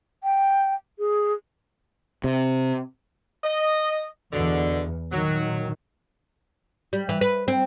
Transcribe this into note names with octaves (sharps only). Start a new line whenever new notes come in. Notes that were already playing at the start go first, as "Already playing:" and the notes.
G5
G#4
C3
D#5
E2 B2 D3
A#2 D#3 F#3
G3
E3
B4
C4